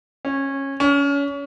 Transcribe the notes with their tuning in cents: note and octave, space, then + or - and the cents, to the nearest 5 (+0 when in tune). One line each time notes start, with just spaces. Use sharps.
C#4 -20
C#4 +30